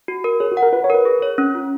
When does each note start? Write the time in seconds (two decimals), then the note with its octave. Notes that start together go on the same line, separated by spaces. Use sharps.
0.08 F#4
0.24 A#4
0.40 G#4 C#5
0.52 F#4
0.57 F#5
0.63 A#4
0.72 F4 B4
0.84 C#5
0.90 A#4 B4
1.05 G#4
1.22 C#5
1.38 C#4
1.55 F4